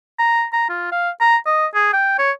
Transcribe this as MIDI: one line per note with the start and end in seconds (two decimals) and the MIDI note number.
0.19 0.45 82
0.53 0.66 82
0.69 0.91 65
0.92 1.10 77
1.21 1.36 82
1.46 1.67 75
1.75 1.91 68
1.93 2.16 79
2.19 2.31 73